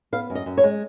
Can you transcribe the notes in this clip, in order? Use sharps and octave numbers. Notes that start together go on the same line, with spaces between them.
B3 F5
F#2
D#5
F#2
C#5
G#3